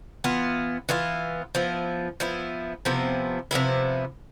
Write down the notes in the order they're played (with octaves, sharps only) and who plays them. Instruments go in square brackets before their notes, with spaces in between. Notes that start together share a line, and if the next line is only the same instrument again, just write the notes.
[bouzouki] E3 B3 F4
E3 B3 F4
F3 B3 E4
F3 B3 E4
C3 F3 B3 E4
C3 F3 B3 E4